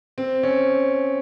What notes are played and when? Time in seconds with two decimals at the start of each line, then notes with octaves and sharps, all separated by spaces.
0.18 C4
0.43 C#4